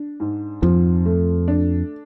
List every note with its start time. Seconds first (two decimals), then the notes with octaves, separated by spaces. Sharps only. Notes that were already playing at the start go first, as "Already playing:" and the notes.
Already playing: D4
0.20 G#2
0.62 F2 F3
1.06 A3
1.48 D4